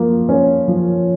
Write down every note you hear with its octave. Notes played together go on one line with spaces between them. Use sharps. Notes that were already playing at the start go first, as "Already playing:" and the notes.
Already playing: F3 A#3
C#4
F3